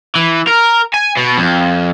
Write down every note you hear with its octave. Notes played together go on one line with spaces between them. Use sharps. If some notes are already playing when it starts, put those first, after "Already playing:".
E3
A#4
G#5
B2
F2